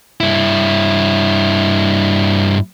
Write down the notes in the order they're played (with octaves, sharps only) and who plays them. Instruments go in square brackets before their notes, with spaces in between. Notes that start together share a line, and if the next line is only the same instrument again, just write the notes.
[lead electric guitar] G2 E4